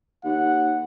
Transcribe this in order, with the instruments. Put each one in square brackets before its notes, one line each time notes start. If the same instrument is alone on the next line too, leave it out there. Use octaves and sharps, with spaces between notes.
[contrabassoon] D#2 [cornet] F#5